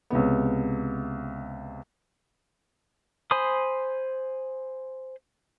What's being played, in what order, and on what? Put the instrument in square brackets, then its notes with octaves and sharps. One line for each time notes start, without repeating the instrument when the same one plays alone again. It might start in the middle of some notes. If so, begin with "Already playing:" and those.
[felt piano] C#2 C3 B3
[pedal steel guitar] C5 G#5 B5 C6 D#6